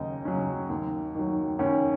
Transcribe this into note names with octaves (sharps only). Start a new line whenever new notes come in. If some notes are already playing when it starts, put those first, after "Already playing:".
Already playing: D#2 C#3 F#3 C#4 D#4 D#5
C#3 F#3 C#4
D#2
D#3 F#3
D#2 C#4 C#5